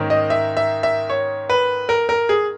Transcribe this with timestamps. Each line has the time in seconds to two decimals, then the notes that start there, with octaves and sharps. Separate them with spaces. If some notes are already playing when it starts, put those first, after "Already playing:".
Already playing: G#2 D#3 A#3 C#4
0.10 D#5
0.30 E5
0.57 E5
0.83 E5
1.10 C#5
1.50 B4
1.89 A#4
2.09 A#4
2.29 G#4